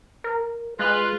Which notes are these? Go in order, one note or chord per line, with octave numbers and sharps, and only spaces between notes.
A#4
G#3 F4 B4 F#6